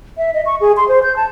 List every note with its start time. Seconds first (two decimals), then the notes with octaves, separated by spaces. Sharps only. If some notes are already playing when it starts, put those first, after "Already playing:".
0.18 E5
0.34 D#5
0.46 C#6
0.61 G#4
0.77 C6
0.88 C5
1.03 G6
1.16 A5